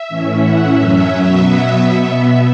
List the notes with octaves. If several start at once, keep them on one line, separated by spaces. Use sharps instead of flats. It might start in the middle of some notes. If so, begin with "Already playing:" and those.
Already playing: E5
A2 E3 C#4
F#5
F#2 F#3 C#4 E5
B2 F#3 B3 E5
E5
B2 B3